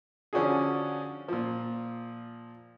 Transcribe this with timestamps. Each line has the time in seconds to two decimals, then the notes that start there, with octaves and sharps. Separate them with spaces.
0.33 D3 F3 C#4 D4 F#4 G#4
1.28 A#2 F3